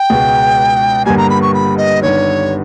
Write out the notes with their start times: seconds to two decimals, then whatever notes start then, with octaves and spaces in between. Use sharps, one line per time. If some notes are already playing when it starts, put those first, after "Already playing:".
Already playing: G5
0.10 C#2 B2 G#3
1.05 G1 G2 G3 A#3 G#5
1.17 A#5
1.30 B5
1.42 C#6
1.54 B5
1.77 D#5
2.01 G1 G2 D#3 C#5